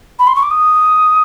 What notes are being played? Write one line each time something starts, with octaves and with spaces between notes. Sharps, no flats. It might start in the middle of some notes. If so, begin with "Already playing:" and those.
B5
C6
C#6
D6
D#6